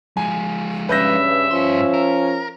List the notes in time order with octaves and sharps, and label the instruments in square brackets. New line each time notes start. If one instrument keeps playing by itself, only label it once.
[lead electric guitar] F3 G#3 [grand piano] G#5
[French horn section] G2 C#3 C#4 [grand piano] B4 G6 A#6 [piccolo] E5
[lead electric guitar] G2 C6 [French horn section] F3 C#4
[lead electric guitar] A#4